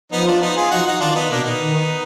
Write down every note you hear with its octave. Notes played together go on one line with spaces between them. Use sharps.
F3 B3 D#4
D4 F4
B3 D#4
F4 G#4
F3 D#4 F#4
D#4 F#4
D#3 D4 F4
D4
B3 D#4
B2 A#3 D4
B3 D#4
D#3